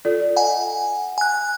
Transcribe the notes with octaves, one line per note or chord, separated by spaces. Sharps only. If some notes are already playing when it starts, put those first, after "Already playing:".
F4 A4 D5
D#5 F#5 G#5
G#5 F#6